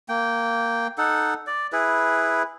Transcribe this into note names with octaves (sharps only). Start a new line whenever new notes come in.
A#3 G5
D#4 A4 F#5
D5
E4 G#4 B4